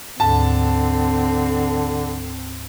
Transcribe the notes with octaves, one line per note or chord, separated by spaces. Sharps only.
D2 G#2 D3 C4 A5